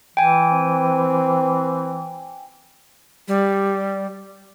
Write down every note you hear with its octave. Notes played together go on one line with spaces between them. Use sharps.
E3 G5 G#5
C4
G3